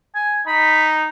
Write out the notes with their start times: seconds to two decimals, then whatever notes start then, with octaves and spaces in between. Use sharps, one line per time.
0.15 G#5
0.47 D#4 B5